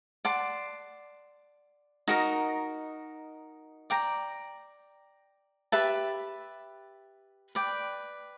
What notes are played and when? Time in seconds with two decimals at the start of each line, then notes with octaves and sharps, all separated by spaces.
0.25 D5 F#5 A5 C6
2.08 D#4 F#4 A#4 D#5
3.90 D5 G5 A#5
5.72 G4 B4 E5 A5
7.55 B4 D5 G5